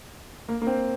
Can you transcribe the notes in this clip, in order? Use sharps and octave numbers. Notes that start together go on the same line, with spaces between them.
A#3
A#3
C4